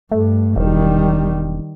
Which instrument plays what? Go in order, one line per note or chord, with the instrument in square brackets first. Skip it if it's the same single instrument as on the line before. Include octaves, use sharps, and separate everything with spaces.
[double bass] G2 [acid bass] A3
[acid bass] E1 [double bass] D#3 G3